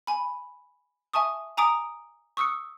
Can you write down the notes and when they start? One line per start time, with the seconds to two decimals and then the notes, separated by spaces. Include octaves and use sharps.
0.07 G#5 B5
1.14 E5 G#5 A5 C#6 D#6
1.57 G#5 A#5 D6 D#6 D7
2.37 C#6 D#6 E6 F#6 C#7